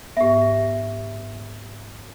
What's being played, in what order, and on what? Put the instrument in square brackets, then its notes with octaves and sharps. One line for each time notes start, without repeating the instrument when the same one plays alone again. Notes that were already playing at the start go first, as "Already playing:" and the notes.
[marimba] G#2 B3 [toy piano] G4 E5